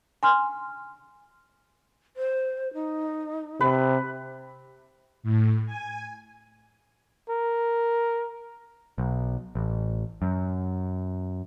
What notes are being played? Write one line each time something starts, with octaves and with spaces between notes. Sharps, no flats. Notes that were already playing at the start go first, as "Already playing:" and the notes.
G#5 C6 F6
C5
D#4
C3 B4
A2
G#5
A#4
B1
A1
F#2